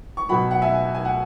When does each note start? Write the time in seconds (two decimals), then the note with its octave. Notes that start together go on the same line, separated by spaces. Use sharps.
0.17 C#6
0.29 B2 F#3 F#5 B5
0.51 F#5
0.62 E5 G#5
0.94 G#5
1.05 F#5